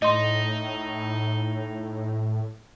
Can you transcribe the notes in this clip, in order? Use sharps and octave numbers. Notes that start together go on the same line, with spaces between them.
A2 D#4 D#5 C6